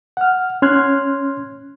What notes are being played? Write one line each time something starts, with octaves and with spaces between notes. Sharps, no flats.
F#5 F6
C#4 C6 F6 F#6 G#6